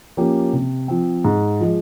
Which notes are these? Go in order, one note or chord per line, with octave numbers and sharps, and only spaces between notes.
F3 A#3 C#4 G4
C3
F3 C4
G#2
F3 G#3